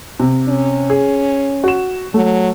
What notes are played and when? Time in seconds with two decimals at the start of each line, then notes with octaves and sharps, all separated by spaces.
0.20 C3
0.48 C#4
0.90 G#4
1.64 F#4 E7
2.14 F#3 A3